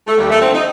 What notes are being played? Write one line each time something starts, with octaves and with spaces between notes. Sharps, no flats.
A3
D#2 G3
A3
D3 F3 C4
D#4